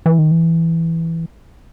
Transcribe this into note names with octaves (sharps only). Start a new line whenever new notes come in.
E3
D#3
E3